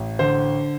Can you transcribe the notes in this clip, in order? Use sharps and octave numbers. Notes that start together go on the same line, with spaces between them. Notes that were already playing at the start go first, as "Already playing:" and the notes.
Already playing: A1
D3 C5